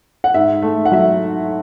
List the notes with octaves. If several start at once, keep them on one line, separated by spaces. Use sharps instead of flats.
F#5
G#2 E5
A3
F#5
F#3 E5